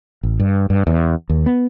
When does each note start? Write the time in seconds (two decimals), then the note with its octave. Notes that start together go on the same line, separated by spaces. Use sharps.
0.23 A1
0.40 G2
0.70 G2
0.87 E2
1.29 D#2
1.46 B3